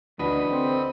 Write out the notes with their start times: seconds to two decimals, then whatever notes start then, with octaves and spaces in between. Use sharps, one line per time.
0.19 D2 E3 D4 F#4 B4 D#5 B5
0.51 D3 C4